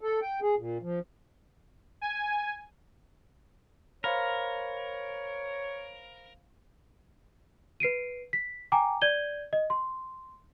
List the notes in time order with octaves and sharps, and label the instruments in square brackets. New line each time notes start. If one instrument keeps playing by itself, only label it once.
[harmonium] A4
G5
G#4
A#2
F3
[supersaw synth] G#5
[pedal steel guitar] A#4 [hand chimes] C5 F5 B5 [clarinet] C#5
[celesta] B4 C7 D7 D#7
B6
G5 G#5 A#5 D6
D5 G6 G#6 D#7 G7
D#5
C6